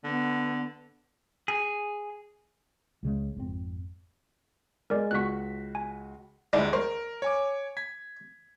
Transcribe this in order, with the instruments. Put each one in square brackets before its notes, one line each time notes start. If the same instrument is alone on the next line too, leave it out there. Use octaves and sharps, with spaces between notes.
[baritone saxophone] D3 [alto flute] B3
[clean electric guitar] G#4
[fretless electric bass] C#2 C#3 G#3
G#1 F2 C4
[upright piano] G#3 [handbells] A#4 D5
[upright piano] C#2 F#4 B6 [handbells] C#6 F#6
[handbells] G#5
[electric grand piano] D2 G2 G#3 [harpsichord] D4 E4 F#5
[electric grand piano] A#4 [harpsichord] C5
[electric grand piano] C#5 G#5 D6
G#6 B6